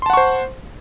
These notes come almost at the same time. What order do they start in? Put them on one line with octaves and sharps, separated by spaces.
C6 A5 F#5 C#6 C5